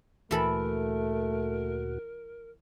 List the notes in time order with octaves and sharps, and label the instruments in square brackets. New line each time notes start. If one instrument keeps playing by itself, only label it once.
[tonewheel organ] D2 A#2 F#4 [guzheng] E3 A4 B5 [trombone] A3 [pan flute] A#4